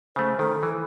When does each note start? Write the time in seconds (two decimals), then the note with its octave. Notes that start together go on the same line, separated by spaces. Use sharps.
0.16 C#3 A3 C5
0.39 D#3 A4
0.63 E3